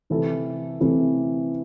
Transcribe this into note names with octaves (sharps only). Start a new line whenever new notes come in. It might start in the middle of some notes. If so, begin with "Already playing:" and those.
C3 E3 C4 E4 A4
C3 E3 C4 E4 A4